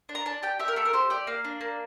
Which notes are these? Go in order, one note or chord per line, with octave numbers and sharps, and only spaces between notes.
D4
A#5
D4 A5
G4 G5
G4 E5
A#4
A3 A4
A#4
G4 C5
G4 D5
A#3 F5
D4
A#3